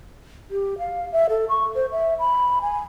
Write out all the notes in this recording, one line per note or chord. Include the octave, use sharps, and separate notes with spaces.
G4
F5
E5
A4
C#6
C5
E5
B5
G#5